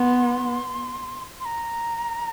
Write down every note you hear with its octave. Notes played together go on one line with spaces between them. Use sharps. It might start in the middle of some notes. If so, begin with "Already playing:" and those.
Already playing: B3 C6
C6
A#5